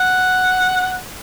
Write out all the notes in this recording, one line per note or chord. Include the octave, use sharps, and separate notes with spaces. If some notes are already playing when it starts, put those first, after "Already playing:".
Already playing: F#5